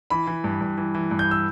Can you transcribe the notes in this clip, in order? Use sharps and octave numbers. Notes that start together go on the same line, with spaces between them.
E3 B5
E3
G2
G2
E3
E3
G2
G6
E6